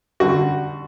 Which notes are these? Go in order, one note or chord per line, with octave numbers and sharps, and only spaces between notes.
D3 G3 F#4